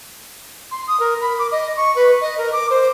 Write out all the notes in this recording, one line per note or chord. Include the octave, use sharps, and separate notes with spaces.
C6
D#6
A#4
B5
D6
D#5
C#6
B4
D#5
A#4
D6
C5